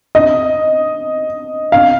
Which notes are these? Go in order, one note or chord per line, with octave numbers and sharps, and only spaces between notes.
D#5
F5